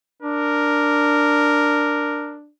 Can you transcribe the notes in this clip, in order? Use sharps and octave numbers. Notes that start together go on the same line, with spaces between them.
D4 A#4